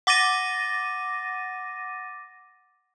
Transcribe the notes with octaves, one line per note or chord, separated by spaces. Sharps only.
F#5 D6 A6 A#6 D#7